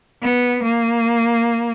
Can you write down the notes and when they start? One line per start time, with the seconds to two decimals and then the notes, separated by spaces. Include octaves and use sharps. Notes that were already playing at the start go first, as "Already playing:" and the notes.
0.22 B3
0.63 A#3